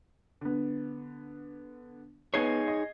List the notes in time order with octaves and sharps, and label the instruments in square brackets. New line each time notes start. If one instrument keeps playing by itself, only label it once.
[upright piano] D3 B3
[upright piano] B3 G#6 C7 [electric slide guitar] D#4 G#4 C#5
[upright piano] D#5